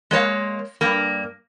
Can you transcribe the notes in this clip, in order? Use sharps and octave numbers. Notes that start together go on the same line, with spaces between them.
G#3 A#3 C#5 F5
G2 A#3